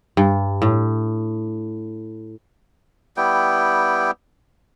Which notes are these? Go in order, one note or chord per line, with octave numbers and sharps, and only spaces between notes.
G2
A2
G3 B3 E4 G5